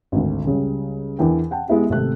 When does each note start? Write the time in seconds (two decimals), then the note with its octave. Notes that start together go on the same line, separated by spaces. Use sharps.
0.12 G#1 D2
0.45 C#2 C#3 G3
1.19 E2 E3 D4 A#4 G5
1.51 F#5 G5 A5
1.68 G#3 B3 E4 G4
1.89 G#1 C3 A3 A4 F#6